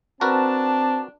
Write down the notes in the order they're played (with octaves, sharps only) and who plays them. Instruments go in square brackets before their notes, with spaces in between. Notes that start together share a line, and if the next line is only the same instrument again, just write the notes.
[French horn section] C4 [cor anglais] D4 [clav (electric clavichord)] F#4 A#4 B4 [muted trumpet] A5